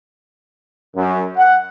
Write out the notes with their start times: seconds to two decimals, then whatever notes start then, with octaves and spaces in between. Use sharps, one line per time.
0.96 F#2
1.37 F#5